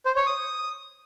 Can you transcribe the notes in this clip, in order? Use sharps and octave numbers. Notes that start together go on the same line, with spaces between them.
C5
C#5
D#6